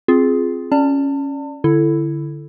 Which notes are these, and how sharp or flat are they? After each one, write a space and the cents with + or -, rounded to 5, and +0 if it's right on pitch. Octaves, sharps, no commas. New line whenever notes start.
C4 +5 F4 +0 G#4 +10
C#4 +0 D5 +0 A5 +35
D3 -10 E4 +10 A4 +0